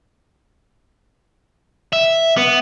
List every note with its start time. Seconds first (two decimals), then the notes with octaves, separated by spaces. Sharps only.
1.93 E5
2.37 B3